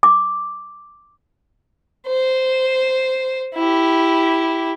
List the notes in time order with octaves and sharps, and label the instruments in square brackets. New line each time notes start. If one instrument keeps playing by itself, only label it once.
[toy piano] D6
[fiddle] C5
E4 G4